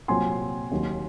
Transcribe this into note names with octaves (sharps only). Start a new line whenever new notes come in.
C2 A#2 F#3 C4 F4 G#5 C6
D#2 D#3 F#3